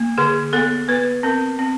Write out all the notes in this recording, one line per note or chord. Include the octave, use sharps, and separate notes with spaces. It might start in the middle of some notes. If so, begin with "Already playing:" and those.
Already playing: A#3
D3 G#4
B3 A4
B3 B4
C4 A#4
C4